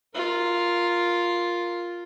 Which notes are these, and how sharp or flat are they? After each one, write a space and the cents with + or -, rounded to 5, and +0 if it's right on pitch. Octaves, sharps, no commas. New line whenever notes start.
F4 +0 A#4 +0